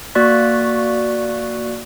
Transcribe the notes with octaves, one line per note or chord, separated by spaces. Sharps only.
A#3 F#4 D5 C#6 F#6 B6